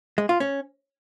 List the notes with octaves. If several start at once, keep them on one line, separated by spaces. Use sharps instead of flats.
G#3
F4
C#4